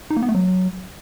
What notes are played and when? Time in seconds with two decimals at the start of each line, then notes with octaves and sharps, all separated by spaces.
0.10 D#4
0.16 A#3
0.22 B3
0.28 A3
0.35 F#3